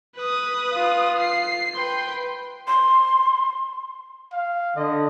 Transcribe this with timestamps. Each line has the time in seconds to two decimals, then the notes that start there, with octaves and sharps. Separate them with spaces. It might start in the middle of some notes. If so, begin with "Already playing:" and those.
0.16 B4 D#6
0.74 F4
1.20 C7
1.76 B4 G5 C6
2.67 C6
4.32 F5
4.76 D3 D#5